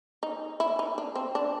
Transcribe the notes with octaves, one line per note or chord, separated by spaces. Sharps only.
D#4
E4
D#4
D4
C4
D4